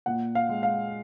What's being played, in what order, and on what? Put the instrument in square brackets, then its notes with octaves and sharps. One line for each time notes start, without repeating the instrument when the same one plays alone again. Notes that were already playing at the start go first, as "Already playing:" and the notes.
[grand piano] A#2 F#5
F5
G#3
F5